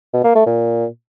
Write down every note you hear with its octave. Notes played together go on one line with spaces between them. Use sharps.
B2
A#3
A3
A#2